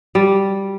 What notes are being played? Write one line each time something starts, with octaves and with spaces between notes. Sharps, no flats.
G3